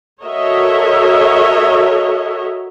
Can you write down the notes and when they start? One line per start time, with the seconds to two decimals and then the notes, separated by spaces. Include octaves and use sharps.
0.24 F#4 A4 A#4 C#5 D#5 E5